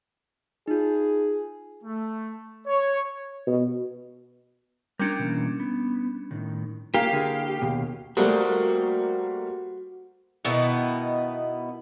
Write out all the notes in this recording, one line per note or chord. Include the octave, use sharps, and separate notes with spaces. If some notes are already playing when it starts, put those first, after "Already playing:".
D#4 F4 G#4
A3
C#5
B2
G3 C#4 D4 A#4 G5
B2 E3 A#3
B3
A2 D#3
A#3 C#4 G4 A#4 E5 F5
D3 E4 G#4 A#4
D#2 B2
G3 A3 A#3 F#4 C5
B2 D#3 B3 E4